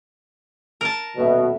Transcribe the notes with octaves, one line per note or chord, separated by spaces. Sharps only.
A#4 A5
D#1 B2 E5